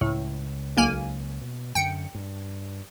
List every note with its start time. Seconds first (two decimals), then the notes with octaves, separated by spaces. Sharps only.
0.01 C#2 A2
0.77 B1 A#3 G#5
1.41 B2
1.75 F#2 D3 G5 C#7
2.15 G2